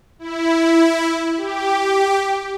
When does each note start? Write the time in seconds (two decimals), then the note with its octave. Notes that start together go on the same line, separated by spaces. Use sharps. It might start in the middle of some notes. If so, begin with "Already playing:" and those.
0.19 E4
1.37 G4